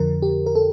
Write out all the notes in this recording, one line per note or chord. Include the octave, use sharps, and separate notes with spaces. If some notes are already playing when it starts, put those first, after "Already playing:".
Already playing: F2 D3 F3 A#4
G4
A#4
A4